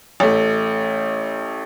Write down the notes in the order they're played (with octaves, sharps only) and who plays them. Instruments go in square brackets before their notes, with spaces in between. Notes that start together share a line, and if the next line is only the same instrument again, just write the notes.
[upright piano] A1 A3